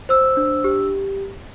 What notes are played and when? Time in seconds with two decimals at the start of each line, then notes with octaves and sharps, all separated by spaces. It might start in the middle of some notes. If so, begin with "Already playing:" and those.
0.09 C5 E6
0.37 D4
0.64 G4